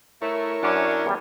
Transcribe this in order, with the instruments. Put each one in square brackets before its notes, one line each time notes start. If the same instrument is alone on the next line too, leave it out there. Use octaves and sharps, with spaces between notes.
[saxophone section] A3 [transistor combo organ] E4 A#4 C#5
[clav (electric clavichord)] F#2 [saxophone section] C#4 D4
[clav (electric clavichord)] E2 G3